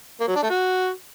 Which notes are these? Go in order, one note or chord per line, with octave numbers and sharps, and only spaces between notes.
A#3
F#3
D4
A3
F#4